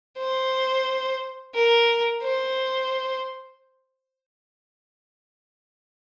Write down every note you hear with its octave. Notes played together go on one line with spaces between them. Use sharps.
C5
A#4
C5